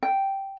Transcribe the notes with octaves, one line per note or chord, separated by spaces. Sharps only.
G5